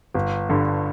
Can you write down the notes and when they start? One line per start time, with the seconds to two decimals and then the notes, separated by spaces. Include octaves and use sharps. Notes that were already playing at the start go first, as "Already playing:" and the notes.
0.15 G1
0.49 G2 D3